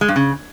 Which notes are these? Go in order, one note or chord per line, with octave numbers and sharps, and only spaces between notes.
G#3
G2
C#3